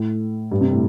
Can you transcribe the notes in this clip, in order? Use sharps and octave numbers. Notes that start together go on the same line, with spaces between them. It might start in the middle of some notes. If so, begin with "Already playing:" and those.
Already playing: A2
G2
C3
A2